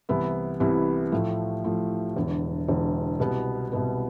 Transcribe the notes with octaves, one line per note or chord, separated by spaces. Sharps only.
C2 C3 E3 B3 E4
C2 C3 E3 B3 E4
A2 F3 A3
A2 F3 A3
E1 E2 D3
E1 E2 D3
C2 B2 B3
C2 B2 B3